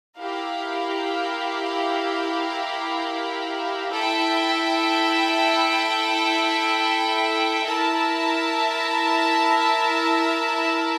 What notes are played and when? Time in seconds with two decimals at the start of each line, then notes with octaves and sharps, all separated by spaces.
0.18 E4 G4 A#4 F5
3.91 E4 A4 E5 G5
7.63 E4 A#4 E5 A5